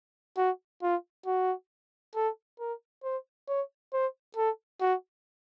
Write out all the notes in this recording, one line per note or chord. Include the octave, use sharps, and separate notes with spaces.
F#4
F4
F#4
A4
A#4
C5
C#5
C5
A4
F#4